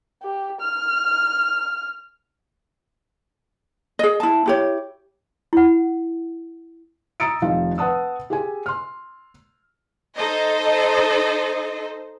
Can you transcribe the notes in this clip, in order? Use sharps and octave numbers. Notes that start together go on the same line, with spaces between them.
G4
F6
G#4 D#5
E4 A5
E4 G4 C#5
E4 F#5
A#5 D#6 E6 A6 C#7 D7
F1 D#3 F3 F5
B4 F#5 A5 D#6 E6
G4 G#4 G#5
C6 F6
D#4 A4 C5 D#5